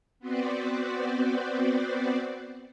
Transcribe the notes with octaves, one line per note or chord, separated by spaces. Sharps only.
B3 C4 F#4 B4 C5 D5